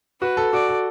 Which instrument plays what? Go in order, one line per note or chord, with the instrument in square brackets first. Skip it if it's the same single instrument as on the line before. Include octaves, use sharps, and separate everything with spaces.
[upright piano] F#4 [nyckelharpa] B4
[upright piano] A4
[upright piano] F#4 [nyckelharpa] D5
[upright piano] A4